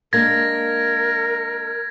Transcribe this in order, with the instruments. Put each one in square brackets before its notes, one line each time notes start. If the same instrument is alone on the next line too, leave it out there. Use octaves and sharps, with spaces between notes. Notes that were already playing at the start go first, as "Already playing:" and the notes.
[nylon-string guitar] G#3 A#3 D4 [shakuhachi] A#4 [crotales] G#6 A#6